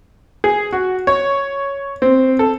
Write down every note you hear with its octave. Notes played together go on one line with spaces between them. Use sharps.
G#4
F#4
C#5
C4
A4